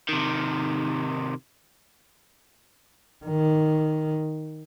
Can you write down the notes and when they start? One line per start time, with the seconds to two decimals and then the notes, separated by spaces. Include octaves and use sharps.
0.09 C3 D#3
3.26 D#3